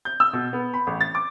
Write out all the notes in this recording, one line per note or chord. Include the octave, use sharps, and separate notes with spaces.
G6
E6
B2
B3
B5
A1
A6
D6